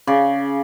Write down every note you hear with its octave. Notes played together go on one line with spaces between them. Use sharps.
C#3 D5